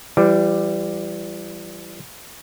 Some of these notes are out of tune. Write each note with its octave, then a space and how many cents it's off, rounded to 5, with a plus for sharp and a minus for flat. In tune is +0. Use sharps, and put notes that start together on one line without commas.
E3 +35 G3 +0